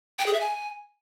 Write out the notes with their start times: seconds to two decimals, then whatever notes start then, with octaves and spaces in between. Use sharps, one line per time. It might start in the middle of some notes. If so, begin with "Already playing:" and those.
0.19 G5
0.26 G#4
0.33 E5
0.41 G#5